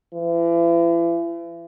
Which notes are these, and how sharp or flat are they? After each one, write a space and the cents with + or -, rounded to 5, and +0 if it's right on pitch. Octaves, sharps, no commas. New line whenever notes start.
E3 +40